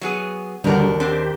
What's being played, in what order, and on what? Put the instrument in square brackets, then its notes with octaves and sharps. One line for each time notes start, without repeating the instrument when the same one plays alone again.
[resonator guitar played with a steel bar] F#3 B3 G#4
[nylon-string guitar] D#2 A#4 [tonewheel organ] D3 G3 [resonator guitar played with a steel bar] D4 F#4
[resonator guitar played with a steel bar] C4 D4 C5 [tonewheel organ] G4